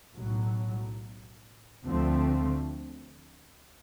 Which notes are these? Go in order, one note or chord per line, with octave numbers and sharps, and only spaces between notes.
B1 A2 F#3
D2 D3 F3 A3 C4